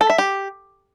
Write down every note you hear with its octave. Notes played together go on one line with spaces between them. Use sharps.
A4
E5
G4